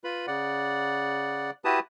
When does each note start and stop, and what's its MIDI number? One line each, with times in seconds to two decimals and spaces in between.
0.04 0.26 65
0.04 0.26 71
0.04 0.26 83
0.27 1.51 49
0.27 1.51 74
0.27 1.51 78
1.65 1.80 64
1.65 1.80 66
1.65 1.80 67
1.65 1.80 71
1.65 1.80 81
1.65 1.80 87